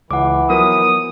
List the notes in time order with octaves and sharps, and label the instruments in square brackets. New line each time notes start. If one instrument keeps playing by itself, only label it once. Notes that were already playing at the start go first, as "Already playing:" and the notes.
[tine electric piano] C#2 [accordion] E3 [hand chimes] F#5 D6
[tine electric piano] F3 F#3 B3 [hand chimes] A#4 [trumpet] D#6